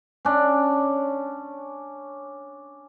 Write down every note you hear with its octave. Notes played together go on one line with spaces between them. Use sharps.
C#4 D4